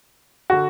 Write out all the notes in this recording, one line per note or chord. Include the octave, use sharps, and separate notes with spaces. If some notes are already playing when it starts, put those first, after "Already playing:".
D3 F#4